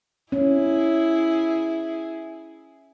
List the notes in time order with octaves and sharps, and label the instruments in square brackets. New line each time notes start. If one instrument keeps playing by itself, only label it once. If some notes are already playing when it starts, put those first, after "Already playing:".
[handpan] C#4 [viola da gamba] E4 G#4